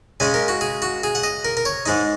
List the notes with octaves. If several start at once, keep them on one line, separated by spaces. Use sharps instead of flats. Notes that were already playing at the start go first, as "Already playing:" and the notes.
C#3 G#3 C#4 G#5
A#4
F#4
G#4
F#4
G#4
F#5
D#5
A#4
A#4
C#5
G#2 G#3 D#4